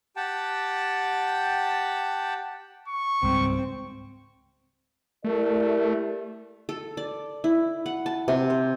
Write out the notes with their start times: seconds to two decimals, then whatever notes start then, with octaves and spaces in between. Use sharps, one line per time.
0.16 G4 F#5 G5 A5
2.88 C#6
3.23 C#2 G#2 G3 C4
5.24 A3 E4 G4 A#4 D5
6.69 A4
6.97 D5
7.44 E4
7.86 F#5
8.06 A5
8.28 C3
8.50 C5